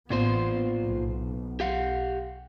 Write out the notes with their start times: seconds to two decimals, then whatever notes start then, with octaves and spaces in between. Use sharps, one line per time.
0.10 A1 A#2 B3 F4 C5
0.84 B1
1.60 G4 F5 F#5